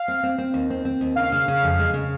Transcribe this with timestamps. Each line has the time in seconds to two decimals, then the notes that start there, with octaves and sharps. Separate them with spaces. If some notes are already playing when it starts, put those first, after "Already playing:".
Already playing: F5
0.08 C4
0.23 C4
0.38 C4
0.54 D#2
0.70 C4
0.85 C4
1.01 D#2
1.16 C#3 F5
1.32 C#3
1.48 C#3
1.63 F2
1.79 G#3
1.94 C#3